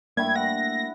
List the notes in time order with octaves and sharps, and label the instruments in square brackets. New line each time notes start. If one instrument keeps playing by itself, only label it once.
[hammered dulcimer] G2 E4 G5 [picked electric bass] A3 A#3 [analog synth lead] G#6
[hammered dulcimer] F#5 [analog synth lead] A#6